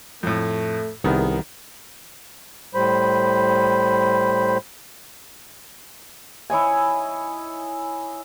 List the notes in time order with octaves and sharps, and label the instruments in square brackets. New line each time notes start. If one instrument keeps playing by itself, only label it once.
[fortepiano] F2 A2 [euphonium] A3
[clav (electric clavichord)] C2 B3 [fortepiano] D#3 [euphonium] G#4
[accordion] A2 G3 C5 B5
[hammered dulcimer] E4 C#5 D#5 G#5